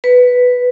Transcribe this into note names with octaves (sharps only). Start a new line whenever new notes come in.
B4